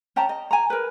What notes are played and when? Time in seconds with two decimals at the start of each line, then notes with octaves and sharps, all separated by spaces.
0.16 C#4 G5 A5 A#5
0.29 D#5
0.51 G#5 A#5
0.70 A#4 B4